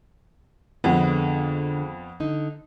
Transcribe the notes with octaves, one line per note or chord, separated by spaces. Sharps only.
F2 D3 G#3 B3
D3 D#4